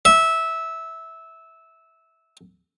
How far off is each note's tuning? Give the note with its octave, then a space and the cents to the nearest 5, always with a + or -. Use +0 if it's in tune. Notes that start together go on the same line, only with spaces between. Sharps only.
E5 -15